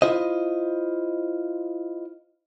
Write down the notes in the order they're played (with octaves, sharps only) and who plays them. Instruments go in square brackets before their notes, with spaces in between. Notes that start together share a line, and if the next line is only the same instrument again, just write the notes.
[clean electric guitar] E4 F4 C5 D#5